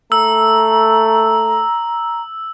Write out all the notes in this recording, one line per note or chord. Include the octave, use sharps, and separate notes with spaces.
A3 A#5 E6